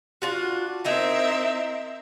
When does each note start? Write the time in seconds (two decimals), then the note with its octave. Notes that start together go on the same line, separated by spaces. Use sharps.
0.22 D4 F4 F#4
0.85 C4 D#4 E4 A#4 E5 A#5